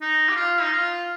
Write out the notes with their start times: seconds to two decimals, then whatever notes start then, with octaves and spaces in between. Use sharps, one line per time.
0.01 D#4
0.29 G4
0.36 F4
0.62 D#4
0.73 F4